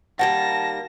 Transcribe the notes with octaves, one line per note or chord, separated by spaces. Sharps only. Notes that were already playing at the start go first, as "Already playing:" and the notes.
D#3 G3 A#3 F#5 A5 A#6